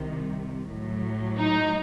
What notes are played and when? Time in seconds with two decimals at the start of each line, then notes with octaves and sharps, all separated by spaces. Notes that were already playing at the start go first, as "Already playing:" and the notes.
Already playing: C2 C3 D#3 G3
0.71 A2 F#3
1.37 D#4